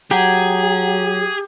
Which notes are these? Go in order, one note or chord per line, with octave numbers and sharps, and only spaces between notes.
F#3 G4 G#4 F#5 A#5